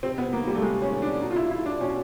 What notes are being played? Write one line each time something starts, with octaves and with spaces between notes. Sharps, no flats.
C3 C4
B3
D#3 A#3
G3
A3
C3 G#3
C#4
D#3
D4
B2 D#4
F4
E4
E4
D4
B2 C#4